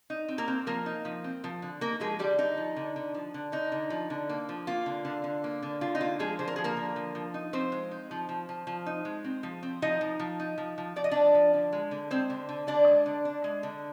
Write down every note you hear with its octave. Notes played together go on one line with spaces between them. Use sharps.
D#4
C4
A#3 A#4
C4
F3 A#3 A#4
D#4
F3
C4
F3
D3
A#3 D#4 A#4
F3 G#3 G#4
D3 G3 G4
D3 D#4
F3
D3
D3
F3
D3
D3 D#4
D3
F3
D3
A#3
F3
A#3 F4
D3
D3
D3
A#3
D3
D3 F4
D#4
A#3 F4
F3 G#3 G#4
D3 C5
A#4
F3 G#4
A#3 A#4
D3
F3
F3
D#4
F3 C4 C5
G#3
D#4
F3
F3
F3
F3
D#4
G#3
C4
F3
C4
F3 D#4 D#5
F3
F3
D#4
F3
F3
F3 D5
D#5
F3 D4 D5
F3
D3
G#3
D3
G#3 C4 C5
D3
D3
D3 D4 D5
G#3
D3
D4
G#3
D3